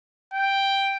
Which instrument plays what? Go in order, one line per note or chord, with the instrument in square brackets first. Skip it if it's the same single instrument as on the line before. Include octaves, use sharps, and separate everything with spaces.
[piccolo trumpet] G5